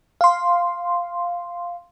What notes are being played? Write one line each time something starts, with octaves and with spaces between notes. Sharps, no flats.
F5 C6